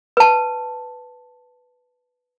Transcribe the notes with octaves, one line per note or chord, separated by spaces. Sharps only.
B4 A5